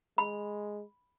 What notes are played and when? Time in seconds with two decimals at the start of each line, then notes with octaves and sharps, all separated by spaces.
0.18 G#3 B5